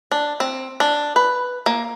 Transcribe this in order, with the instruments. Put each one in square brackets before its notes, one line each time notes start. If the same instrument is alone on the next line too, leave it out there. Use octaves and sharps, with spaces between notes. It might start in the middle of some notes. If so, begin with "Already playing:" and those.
[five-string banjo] D4
C4
D4
B4
A#3